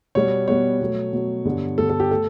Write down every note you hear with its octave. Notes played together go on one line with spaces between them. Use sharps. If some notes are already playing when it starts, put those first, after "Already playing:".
B2 G3 B3 C#5
B2 G3 B3 C#5
B2 F#3 A3
B2 F#3 A3
G2 D3 G3 B3
G2 D3 G3 B3 A4
A4
G4
A3 A4